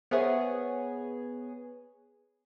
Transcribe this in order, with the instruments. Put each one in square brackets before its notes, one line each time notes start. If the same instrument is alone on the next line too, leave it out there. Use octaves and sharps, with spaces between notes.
[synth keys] B3 G#4 C#5 [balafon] A#4 C5 E5